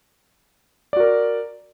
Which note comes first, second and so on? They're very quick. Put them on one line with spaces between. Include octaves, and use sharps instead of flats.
D5 F#4 A#4